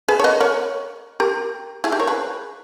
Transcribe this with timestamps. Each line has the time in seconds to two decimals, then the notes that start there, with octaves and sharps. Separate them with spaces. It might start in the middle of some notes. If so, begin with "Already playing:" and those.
0.08 G#4 B4
0.19 C#5
0.24 B4 D#5
0.41 A#4 C#5
1.20 G4 A#4
1.84 E4 G#4
1.92 D#4 G4
2.00 A#4 C#5
2.07 G#4 B4